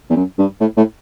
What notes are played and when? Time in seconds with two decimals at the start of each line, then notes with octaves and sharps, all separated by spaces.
0.10 E2
0.16 F#2
0.39 G2
0.60 A2
0.77 A2